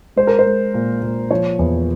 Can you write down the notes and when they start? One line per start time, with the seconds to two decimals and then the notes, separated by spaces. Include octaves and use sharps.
0.16 G#3 C5
0.27 A#4
0.39 C5
0.46 G#3
0.74 A#2
1.02 A#2
1.31 F3 C#5
1.59 E2